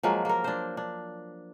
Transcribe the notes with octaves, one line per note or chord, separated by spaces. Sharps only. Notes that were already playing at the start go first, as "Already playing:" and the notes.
F3 F#3 G#3 A#3
A#3 A#4
D4 C5
D4